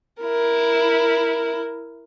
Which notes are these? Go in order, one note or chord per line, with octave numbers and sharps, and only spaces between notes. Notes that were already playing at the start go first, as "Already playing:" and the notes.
E4 A#4